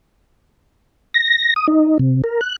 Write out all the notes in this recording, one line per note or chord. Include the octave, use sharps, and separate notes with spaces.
A#6
D#6
D#4
C3
A#4
F#6